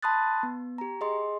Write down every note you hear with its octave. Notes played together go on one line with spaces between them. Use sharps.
A5 B5 C6 D#6 F#6 A6
B3
G4 A#5
G#4 D#5 C6